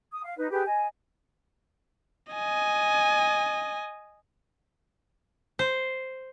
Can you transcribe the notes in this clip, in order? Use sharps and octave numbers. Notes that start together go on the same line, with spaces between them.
D#6
F5
D#4 B4
G4 G#4 B4
D#5 G#5
D#5 G#5
C5